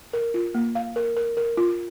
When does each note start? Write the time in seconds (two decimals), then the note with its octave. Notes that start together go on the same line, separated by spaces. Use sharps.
0.13 A#4
0.34 F4
0.54 A#3
0.75 F5
0.96 A#4
1.17 A#4
1.37 A#4
1.57 F4